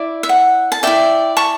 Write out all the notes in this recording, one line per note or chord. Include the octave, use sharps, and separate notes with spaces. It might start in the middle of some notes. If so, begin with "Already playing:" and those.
Already playing: E4 D5
E5
F#5
A5
E4 B4 D5 E5 G5
A5 C#6